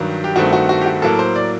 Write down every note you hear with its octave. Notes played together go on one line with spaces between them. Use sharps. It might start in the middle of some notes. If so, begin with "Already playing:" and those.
Already playing: G2 D#3 F#3
G4
G2 D#3 A3 C4 F#4
F#4
F#4
G4
F#4
A2 F#3 A#3 A4
C5
D5